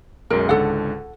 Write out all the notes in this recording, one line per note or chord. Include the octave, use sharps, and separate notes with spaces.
B1 F#2 G#3 A#4
C#2 G#2 D3 A4 F#5